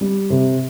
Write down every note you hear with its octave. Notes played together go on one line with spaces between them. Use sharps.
G3
C3